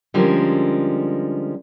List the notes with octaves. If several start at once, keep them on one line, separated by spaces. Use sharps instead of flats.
D3 F3 G3 G#3 C#4 A#4